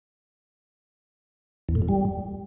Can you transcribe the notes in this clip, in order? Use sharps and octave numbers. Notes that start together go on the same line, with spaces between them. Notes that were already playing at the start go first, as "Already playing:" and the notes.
E2
A2
F2
G3